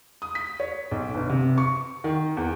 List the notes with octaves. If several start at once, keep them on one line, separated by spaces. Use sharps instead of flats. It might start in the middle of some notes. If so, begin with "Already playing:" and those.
D#6
B6
C#5
B1
G1
C3
C#6
D#3
E2